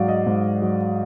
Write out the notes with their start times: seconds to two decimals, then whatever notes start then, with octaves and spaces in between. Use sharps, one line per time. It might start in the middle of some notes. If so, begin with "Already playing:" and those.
Already playing: G#2 F#3 D5 F5
0.08 D#5
0.26 G#2
0.62 F#3